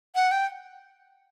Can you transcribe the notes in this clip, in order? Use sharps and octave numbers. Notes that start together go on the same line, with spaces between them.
F#5
G5